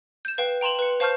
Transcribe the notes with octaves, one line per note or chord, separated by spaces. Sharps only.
G6 E7
B4 F5 G5
G5 A#5 C6 E7 F#7
B4 C#7
C5 F5 A5 C#6 F6 G6